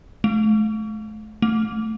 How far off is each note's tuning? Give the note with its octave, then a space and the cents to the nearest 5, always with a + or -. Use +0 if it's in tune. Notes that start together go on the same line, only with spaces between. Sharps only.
A3 -35
A3 +5